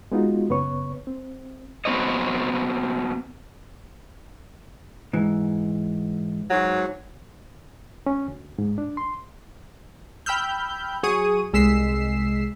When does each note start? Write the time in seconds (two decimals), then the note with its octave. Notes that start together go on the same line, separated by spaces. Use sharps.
0.12 G#3 B3 D#4 F4 F#4
0.49 F#2 C#3 B3 B4 C#5 C#6
1.07 C4
1.85 F#3 B3 C4 C#5 D#5
5.13 G#2 E3
6.51 G#2 F#3
8.06 C#4
8.28 D2
8.58 G#2
8.78 D4
8.97 C6
10.26 G5 B5 E6 F6 G6
11.03 F#3 G#4 C#6 D#6 D#7
11.53 C2 G#3 E6 B6 C7 E7